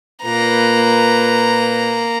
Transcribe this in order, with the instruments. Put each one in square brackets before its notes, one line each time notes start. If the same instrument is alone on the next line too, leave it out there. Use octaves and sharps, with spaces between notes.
[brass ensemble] A#2 B4 [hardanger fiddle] A#3 A#5